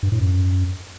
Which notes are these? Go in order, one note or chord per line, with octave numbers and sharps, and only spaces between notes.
G2
A2
F#2